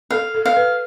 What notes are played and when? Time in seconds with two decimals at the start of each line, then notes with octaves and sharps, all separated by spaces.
0.11 A4 F5
0.34 A4
0.45 F5
0.56 B4